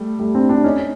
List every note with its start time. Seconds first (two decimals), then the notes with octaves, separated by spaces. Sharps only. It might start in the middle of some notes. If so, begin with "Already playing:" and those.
Already playing: G3 A3
0.19 G3 A3
0.35 C4 D4
0.49 C4 D4
0.64 C#4 D#4